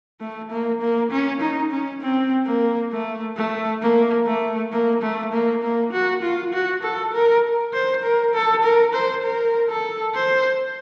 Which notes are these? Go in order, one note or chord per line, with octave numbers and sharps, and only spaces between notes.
A3
A#3
A#3
C#4
D#4
C#4
C4
A#3
A3
A3
A#3
A3
A#3
A3
A#3
A#3
F#4
F4
F#4
A4
A#4
C5
A#4
A4
A#4
C5
A#4
A4
C5